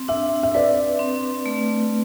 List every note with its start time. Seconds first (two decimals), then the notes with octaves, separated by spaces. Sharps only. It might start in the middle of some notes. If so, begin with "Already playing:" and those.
Already playing: C4
0.08 D4 E5
0.43 E5
0.54 B4 D5
0.99 C4
1.46 A3